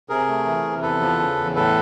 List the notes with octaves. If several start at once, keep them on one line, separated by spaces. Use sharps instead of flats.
C3 G#4 A#4
A3
E3
C3
E2 A4 B4
F3
C#3
E2
A2 A4 B4